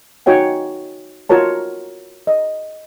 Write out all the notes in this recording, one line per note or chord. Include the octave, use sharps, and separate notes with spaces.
D#4 F#4 C#5 G5 G#5
F4 F#4 A#4 C#5 A5
D#5